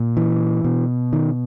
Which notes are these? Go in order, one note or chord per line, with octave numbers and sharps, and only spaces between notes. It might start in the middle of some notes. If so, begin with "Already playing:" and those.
Already playing: A#2
E3
B2
D#3